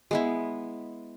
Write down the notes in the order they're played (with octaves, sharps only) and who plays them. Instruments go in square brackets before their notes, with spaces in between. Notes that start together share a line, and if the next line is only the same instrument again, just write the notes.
[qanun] G#3 B3 E4